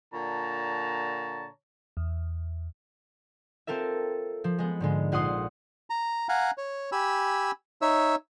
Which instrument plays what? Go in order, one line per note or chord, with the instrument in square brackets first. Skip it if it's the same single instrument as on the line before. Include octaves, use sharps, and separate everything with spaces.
[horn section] A#2 D3 C#5 A5 A#5
[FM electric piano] E2
[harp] C4 F4 A4 A#4 E5
F3
G#3 B3
G#2 D3 G#3
A#1 F4 F#5 C6 D#6 C7
[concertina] A#5
F5 F#5 G#5 A#5
C#5
G4 G#5 B5 E6
D#4 C#5 E5 E6